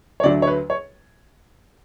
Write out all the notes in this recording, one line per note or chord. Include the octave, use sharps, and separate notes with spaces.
C#5
D2 D3 F#3 A3 D5
C#5
B4
C#5